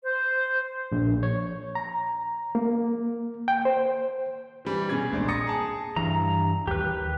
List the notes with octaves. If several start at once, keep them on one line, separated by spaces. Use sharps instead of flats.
C5
A#1
C#5
A#5
A#3
G5
C5
E3 G3
B2 C#4 G#4 G#6
E1 A#1 G#3 C4 D4 D5
A#5 D#6 A6 A#6 C#7
G#4 A5
G2 E3 A#5
D#2 G4 B4